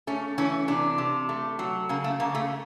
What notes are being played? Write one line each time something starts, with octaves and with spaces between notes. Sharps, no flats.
A3 C#4
E3 C#4
C3 D4
C3
A3
F#3
C#3 A#3
A3
C#3 A#3
A3